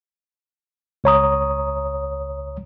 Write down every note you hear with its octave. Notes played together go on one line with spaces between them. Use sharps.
C#2 C#5 A#5 D#6